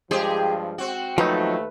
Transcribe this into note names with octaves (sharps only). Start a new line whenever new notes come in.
G2 F3 G#3 G4 G#4 C5
C4 F#4
D#2 F3 F#3 A3 D#4 B4